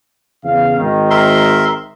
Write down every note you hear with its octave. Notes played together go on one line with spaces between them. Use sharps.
E2 C#3 F5
G#1 D#3
A#4 E5 C6